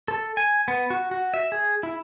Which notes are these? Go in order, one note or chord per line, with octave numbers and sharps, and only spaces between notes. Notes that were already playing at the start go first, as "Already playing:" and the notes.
A4
G#5
B3
F#4
F#4
E5
G#4
E4